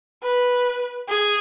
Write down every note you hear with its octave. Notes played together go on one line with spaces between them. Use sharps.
B4
G#4